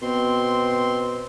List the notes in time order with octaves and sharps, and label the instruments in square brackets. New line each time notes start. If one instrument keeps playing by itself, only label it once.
[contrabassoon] B2 [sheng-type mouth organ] C4 C6